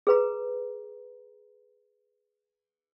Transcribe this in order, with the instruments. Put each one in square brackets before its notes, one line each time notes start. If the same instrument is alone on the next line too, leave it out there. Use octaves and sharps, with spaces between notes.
[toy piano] G#4 B4 A#5